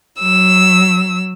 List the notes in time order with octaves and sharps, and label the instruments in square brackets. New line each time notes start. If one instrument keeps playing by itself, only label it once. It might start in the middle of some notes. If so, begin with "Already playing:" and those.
[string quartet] F#3 E6